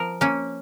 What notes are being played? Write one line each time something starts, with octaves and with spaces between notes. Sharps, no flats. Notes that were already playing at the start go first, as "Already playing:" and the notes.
Already playing: F3 A#4
A#3 C#4